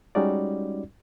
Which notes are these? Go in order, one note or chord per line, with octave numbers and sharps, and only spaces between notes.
G3 G#3 C#4 D#4 F#4 D5